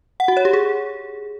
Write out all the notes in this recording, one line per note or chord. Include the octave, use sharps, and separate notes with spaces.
F#5
F#4
C#5
G4
G#4